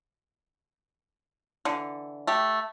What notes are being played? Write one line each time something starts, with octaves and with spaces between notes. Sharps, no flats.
D3 E3
A3 G4